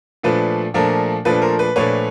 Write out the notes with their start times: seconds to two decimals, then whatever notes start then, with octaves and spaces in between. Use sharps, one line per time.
0.23 A#2 F3 A3 D4 B4
0.74 A#2 F3 A3 D4 A#4
1.25 A#2 F3 A3 D4 B4
1.42 A#4 C5
1.59 B4
1.76 A#2 F3 A3 D4 B4 C#5